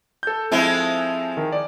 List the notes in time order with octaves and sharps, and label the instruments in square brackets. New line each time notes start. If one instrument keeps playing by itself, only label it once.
[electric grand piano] A4 G6
[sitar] F3 G#3 E4 [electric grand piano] C4 A4
[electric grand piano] D#3
D5